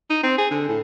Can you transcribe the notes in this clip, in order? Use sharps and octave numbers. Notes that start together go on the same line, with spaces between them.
D#4
C4
G#4
D3
A2